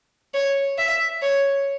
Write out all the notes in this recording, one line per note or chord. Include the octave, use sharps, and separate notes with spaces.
C#5
E5
C#5